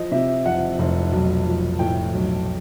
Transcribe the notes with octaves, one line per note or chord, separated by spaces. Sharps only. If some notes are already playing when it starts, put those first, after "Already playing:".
Already playing: F3 D#5
C3 E5
F2 F#5
F1
B1
F3
A2 G5
B1